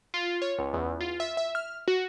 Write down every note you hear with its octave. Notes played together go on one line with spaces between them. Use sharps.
F4
C#5
C#2
E2
F4
E5
E5
F6
F#4